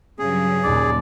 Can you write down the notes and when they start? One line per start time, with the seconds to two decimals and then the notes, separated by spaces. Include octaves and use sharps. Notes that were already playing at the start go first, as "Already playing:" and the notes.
0.19 G2 C#3 F#3 G#4
0.64 D#2 A#2 D5